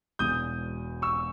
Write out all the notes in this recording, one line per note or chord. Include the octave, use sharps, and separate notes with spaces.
E1 E2 B2 G#3 D#6 G6
C#6 E6